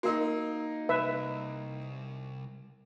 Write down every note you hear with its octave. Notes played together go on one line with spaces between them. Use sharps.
A#3 D#4 F#4 A#4
C2 B4 E5